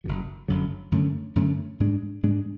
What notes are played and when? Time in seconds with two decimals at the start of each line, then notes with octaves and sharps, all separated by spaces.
0.04 F#1 F#2 D3 F#3
0.48 F#1 F#2 D3 F#3
0.92 F#2 D3 A3 C#4
1.36 F#2 D3 A3 C#4
1.80 G#2 G#3 D4
2.23 G#2 G#3 D4